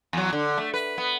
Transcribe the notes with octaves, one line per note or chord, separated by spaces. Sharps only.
E2 F#3
D3
A3
B4
B3